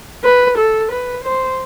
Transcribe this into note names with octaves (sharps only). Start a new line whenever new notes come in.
B4
A4
B4
C5